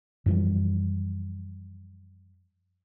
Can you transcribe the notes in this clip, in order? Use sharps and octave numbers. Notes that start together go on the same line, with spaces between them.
F#2 E3 F3 G3